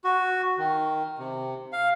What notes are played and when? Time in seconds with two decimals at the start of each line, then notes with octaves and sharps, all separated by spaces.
0.04 F#4
0.58 D#3
1.19 C3
1.73 F5